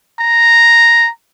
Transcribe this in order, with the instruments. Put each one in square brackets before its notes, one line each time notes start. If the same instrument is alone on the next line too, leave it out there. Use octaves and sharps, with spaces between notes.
[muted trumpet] A#5